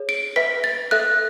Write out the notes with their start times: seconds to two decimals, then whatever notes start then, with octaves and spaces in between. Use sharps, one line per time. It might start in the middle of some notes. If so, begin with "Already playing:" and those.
Already playing: G#4 C#5
0.09 D7
0.36 B4 E5 B6
0.64 A6
0.91 A4 E5 F#6